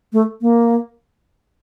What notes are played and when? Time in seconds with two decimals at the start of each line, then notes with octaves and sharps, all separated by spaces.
0.13 A3
0.42 A#3